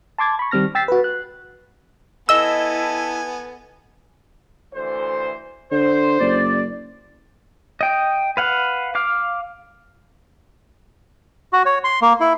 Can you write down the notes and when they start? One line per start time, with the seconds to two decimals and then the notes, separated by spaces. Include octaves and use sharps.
0.18 A5 C6 D6 G#6 A6
0.39 B5 C#6
0.51 D#3 G3 C4 F6 A#6
0.75 G5 E6 A6 B6 C7
0.88 F#4 B4
1.04 F#6
2.29 B3 E4 A4 D#5 G#5 A5 E6
4.74 D2 E3 C5
5.72 D3 C5
6.20 F#1 D5
7.81 D#5 G5
8.37 B4 F5 F#5
8.95 F5 D6 F6
11.53 F#4
11.66 C#5
11.84 C6
12.02 A#3
12.20 E4